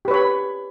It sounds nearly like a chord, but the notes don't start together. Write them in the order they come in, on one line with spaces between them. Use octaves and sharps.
G4 B4 C#5 B5